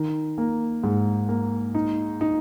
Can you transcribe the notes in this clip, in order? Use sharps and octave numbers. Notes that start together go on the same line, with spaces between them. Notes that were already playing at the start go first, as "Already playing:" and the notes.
Already playing: D#3
A#3
G#2
A#3
D#4
D#4